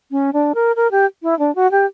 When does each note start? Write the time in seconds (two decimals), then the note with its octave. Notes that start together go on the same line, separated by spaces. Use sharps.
0.11 C#4
0.33 D4
0.55 A#4
0.76 A#4
0.91 G4
1.23 E4
1.39 D4
1.55 F#4
1.71 G4